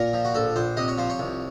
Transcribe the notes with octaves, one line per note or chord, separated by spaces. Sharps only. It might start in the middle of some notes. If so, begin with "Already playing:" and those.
Already playing: A#2 A#4
F3
F#4
A#1 A4
A#1 C5
C3 D#5
C#5
F3 C5
C#5
C2